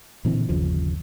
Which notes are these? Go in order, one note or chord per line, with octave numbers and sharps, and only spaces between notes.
A#2 D3 E3 C4
G1 D#2 C#3 F3